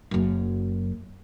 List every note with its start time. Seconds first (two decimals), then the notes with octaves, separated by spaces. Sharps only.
0.11 F#1 F#2